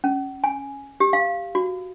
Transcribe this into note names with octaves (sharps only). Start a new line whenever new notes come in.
C#4
G#5
G4
F5
F#4